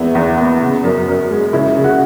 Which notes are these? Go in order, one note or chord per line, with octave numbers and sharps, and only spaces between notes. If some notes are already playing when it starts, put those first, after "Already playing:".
Already playing: E2 G#3 B3 E4
E2
B3
C#3
F#2
F#2
G#3
C#3 E4
C#3
F#4